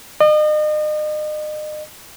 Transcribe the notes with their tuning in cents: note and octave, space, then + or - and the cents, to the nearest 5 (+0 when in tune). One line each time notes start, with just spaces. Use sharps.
D#5 -40